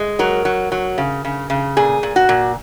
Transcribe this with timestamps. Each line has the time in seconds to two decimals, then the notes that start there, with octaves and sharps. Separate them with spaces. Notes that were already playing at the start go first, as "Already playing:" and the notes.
Already playing: G#3
0.19 F#3 A#4
0.45 F#3
0.72 F#3
0.98 C#3
1.25 C#3
1.50 C#3
1.77 A#2 G#4
2.03 A#2
2.16 F#4
2.29 A#2